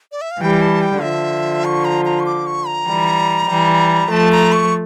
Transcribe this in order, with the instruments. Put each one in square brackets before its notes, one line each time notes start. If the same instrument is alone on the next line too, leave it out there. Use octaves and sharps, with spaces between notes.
[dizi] D5
E5
F5
[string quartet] E3 G3 [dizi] G5
[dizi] A5
G5
[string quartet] D3 F3 [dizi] E5
[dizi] C#6
A#5
A#5
C#6
D6
C#6
A#5
[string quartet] E3 G3
E3 G3
[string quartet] F3 A3 [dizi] A5
[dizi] A#5
C#6